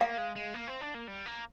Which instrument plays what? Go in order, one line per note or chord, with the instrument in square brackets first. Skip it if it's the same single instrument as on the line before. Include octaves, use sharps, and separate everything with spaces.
[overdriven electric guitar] A#3 [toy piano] F5
[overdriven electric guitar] G#3
G#3
A#3
C4
D4
A#3
G3
A#3